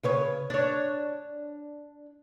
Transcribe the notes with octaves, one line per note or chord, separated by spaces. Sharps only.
C#3 B4 C#5
D4 C#5